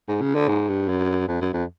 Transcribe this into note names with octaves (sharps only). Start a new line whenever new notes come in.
G#2
C#3
D3
G#2
G2
F#2
F2
F#2
F2